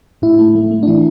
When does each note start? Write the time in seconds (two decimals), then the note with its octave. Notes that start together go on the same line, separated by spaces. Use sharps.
0.22 A2 E4
0.39 A3
0.55 A3
0.71 A3
0.83 D4
0.87 E3 E4